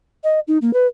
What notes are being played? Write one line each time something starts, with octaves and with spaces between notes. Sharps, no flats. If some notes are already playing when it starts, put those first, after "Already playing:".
D#5
D#4
A#3
B4